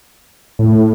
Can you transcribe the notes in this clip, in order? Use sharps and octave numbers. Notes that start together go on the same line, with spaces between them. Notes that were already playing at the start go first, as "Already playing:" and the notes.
A2